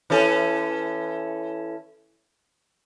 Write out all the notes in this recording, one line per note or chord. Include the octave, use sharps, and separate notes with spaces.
E3 C#4 A4